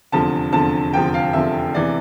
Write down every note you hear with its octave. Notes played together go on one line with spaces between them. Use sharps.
F1 E2 D3 F3 A5
F1 E2 D3 F3 A5
F1 E2 D3 F3 G5
F5
F1 E2 D3 F3 E5
F1 E2 E3 D5